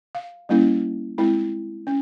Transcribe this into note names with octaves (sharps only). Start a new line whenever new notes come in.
F5
G3 A#3 C#4 E4
G#3 C4 E4
C#4